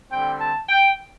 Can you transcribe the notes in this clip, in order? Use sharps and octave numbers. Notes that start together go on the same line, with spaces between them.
D3 G3 C4 G5
A5
G5